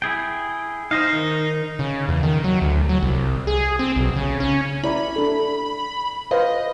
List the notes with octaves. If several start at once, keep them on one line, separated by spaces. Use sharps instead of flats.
E4 G#4 G5
D#4 C5 D#5 F5
D#3
C#3
E2
D#3
F#3
D2
F#3
C2
G#4
C4
B1
C#3
C#4
E4 D5 A#5 B5
D4 A4
B4 C5 D#5 F5